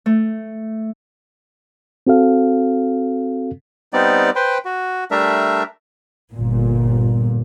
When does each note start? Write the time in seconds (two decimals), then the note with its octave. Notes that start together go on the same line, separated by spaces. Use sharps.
0.06 A3
2.07 C4 F#4 A4 F5
3.93 G3 B3 C4 D#4 D5
4.36 B4 C5 G5
4.65 F#4
5.11 G3 A3 D4 A#4 E5
6.33 G1 A#2